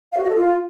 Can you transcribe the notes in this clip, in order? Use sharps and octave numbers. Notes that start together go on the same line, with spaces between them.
F5
F#4
D#5
A4
F4